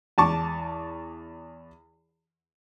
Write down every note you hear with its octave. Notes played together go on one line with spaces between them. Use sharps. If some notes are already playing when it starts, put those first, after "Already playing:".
E2 A5 C#6 D6